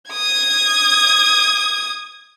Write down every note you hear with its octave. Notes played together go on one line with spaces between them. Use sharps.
D#6 G#6